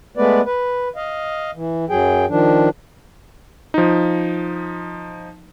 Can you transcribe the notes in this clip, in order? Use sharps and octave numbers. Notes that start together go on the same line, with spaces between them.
G#3 A3 B3 B4 D5
B4
D#5 F5
E3
F#2 F#3 G#4 G5
D#3 F3 D4
F3 D#4